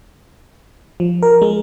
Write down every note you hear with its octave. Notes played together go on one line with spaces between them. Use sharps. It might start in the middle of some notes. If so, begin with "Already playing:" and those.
F3
A#4
G#3